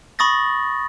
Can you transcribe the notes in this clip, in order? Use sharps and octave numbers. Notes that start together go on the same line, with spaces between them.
B5 C#6 D#6 A6 A#6